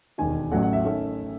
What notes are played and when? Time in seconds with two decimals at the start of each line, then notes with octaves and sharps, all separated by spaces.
0.18 E1 D#2 D#3 G#5
0.51 A1 A2 F#3 A3 C#4 F#5
0.63 F#5
0.73 E5
0.84 D#3 A3 C#4